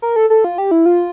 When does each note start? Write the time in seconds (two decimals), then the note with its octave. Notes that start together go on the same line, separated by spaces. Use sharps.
0.02 A#4
0.16 A4
0.30 A4
0.44 F4
0.58 G4
0.71 E4
0.86 F4